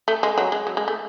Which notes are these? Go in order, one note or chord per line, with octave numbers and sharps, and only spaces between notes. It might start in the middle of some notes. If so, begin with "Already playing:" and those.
A3
G#3
F#3
G#3
F#3
G#3
A3